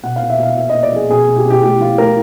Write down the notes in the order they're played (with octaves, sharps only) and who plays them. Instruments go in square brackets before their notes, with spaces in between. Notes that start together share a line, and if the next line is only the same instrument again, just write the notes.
[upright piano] B2 F#5
F5
B2
E5
B2 F5
A#2 E5
A#2 D#5
D5
F3 G#4
B2 G#4
B2
G4
B2
G4
A2 G4
F3 F4
A2 A#4